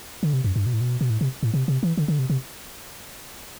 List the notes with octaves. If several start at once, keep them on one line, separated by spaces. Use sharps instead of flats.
D3
C3
F#2
G2
B2
A2
B2
B2
A2
C3
A2
C3
C3
E3
D3
D3
C3
C3